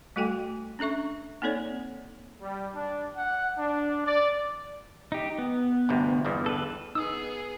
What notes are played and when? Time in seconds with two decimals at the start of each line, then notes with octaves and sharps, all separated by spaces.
0.16 G3 A3 F#4 A4 G5 G#5
0.79 C#4 D4 A4 E5 C#6
1.42 A#3 C4 D#4 A4 C#5 D5
2.41 G3
2.73 D4
3.16 F#5
3.59 D4
4.05 D5
5.12 D#4 G4
5.38 B3
5.89 G1 D2 C3
6.25 G1 E2 G2
6.46 A4 B4
6.95 B3 D#4 G#4 D#6 E6